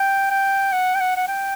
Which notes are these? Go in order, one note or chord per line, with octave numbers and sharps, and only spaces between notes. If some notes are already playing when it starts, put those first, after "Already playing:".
Already playing: G5
G5
F#5
G5
F#5
F#5
G5